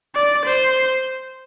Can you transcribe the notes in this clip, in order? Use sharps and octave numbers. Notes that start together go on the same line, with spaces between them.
D5
C5